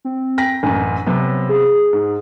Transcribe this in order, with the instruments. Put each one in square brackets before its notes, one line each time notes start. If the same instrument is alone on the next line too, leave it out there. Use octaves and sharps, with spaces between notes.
[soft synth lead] C4
[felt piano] G5 A#6 B6
[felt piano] A1 F#2 [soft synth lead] G#5
[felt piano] C3 B3 [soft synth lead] F#3
[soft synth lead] G#4
[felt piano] G#2